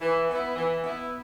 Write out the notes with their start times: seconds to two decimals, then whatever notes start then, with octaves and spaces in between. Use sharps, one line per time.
0.01 E3
0.28 B3 E4
0.56 E3
0.82 B3 E4